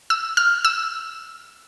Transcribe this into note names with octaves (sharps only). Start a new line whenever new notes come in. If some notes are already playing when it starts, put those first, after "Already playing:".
E6
F6
E6